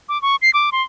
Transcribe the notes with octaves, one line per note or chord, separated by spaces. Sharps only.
D6
C#6
C7
D6
C6